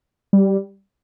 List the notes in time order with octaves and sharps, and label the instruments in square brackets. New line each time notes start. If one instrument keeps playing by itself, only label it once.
[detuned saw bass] G3